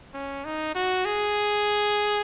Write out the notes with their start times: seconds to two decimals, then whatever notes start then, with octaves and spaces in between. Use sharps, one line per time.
0.14 C#4
0.45 D#4
0.75 F#4
1.05 G#4